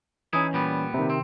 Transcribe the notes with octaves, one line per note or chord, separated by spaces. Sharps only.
E3 C#4 D#4 E4 G#4
A#2 G3 B3
C3 D#3
C4